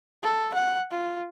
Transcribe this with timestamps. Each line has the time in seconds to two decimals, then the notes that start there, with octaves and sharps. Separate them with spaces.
0.23 A4
0.54 F#5
0.91 F4